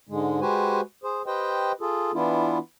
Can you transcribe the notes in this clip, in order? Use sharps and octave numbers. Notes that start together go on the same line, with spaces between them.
G#2 D3 G#3
G#3 F#4 G4 B4 C5 G#5
G#4 C5
G4 B4 C5 D#5 G5
F4 G#4 A4
E3 B3 D4 E4 F4